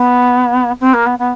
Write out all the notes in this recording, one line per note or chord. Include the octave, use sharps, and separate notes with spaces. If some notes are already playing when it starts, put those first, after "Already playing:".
Already playing: B3
C4
A#3
B3
B3